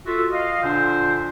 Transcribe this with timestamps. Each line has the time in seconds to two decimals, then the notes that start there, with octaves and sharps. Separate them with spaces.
0.06 F4 F#4 A4 E5
0.32 D#5 F5
0.63 A#2 D3 D4 C5